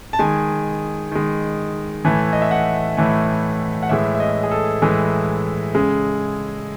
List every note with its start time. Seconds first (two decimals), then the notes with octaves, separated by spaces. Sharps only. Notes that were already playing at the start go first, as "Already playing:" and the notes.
0.13 A5
0.19 D#3 G#3 G#5
1.11 D#3 G#3
2.04 A2 E3 A3 G#5
2.33 D#5
2.42 E5
2.51 F#5
2.97 A2 E3 A3
3.83 F#5
3.89 A2 E3 G#3 E5
4.15 E5
4.20 D#5
4.43 G#4
4.51 A4
4.82 A2 E3 G#3
5.75 C#3 G#3